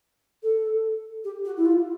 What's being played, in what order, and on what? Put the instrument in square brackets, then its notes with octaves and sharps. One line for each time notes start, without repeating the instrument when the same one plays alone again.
[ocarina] A4
G4
F#4
E4
F4